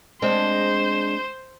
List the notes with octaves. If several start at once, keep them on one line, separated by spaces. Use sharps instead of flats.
G#3 C4 D4 C5